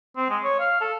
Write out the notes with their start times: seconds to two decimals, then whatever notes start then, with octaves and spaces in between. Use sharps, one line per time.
0.17 C4
0.29 G#3
0.44 C#5
0.60 F5
0.81 A4